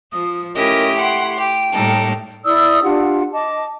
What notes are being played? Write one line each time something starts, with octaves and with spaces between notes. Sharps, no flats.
F3 D#6
A3 C#4 E4 G4 A#4 D#5
F#5 G5 C6
G4 G5
A2 G3 A#3 D#4 A4
E4 D5 D#6 E6
D4 F4 G4 F#5
D#5 A5 D6